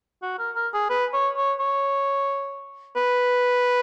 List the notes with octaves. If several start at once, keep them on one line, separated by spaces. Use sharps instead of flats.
F#4
A#4
A#4
G#4
B4
C#5
C#5
C#5
B4